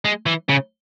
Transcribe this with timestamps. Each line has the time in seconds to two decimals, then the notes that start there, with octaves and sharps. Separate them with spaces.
0.05 G#3
0.26 E3
0.49 C#3